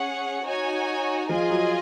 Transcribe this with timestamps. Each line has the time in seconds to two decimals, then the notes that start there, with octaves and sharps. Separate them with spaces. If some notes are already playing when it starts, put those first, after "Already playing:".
Already playing: C#4 G#4 C#5 F#5
0.45 D#4 F#4 C#5 G#5
1.29 F3 F4 G#4 D#5 G#5
1.50 F#3